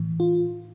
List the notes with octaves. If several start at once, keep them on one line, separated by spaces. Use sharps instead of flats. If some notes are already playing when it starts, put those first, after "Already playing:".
Already playing: A2 E3
F4